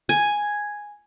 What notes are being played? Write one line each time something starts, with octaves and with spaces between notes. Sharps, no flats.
G#5